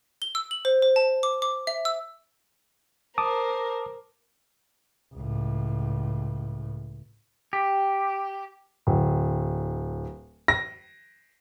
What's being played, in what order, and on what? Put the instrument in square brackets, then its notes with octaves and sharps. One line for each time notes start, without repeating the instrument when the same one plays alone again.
[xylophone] G7
E6
F#7
C5
C5
A5
D6
D6
E5
E6
[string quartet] A#4 C5 [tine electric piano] A5 D6 D#6
[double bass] C#2 A2
[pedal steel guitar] G4
[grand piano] D1
A#6